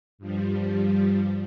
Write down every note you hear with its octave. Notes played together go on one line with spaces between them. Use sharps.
G2 F3 G3